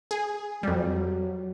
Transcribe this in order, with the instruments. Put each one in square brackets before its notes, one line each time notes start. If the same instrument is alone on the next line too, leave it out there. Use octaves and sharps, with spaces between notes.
[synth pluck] G#4
[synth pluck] F2 G3 [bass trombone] F#3